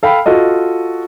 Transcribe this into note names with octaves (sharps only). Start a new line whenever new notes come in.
A4 F5 G5 B5
F4 F#4 A4 D#5